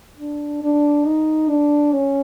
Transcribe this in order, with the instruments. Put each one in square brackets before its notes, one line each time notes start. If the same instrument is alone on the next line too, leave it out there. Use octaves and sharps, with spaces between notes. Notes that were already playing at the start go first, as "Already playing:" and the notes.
[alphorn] D4
D4
D#4
D4
C#4